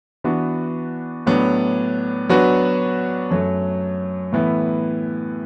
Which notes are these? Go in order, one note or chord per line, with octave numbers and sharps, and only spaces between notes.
E3 B3 D4 F#4 B4
A2 F#3 B3 D4
F#3 B3 D4 F#4 B4
F#2 F#3 A3
A2 E3 B3 E4 B4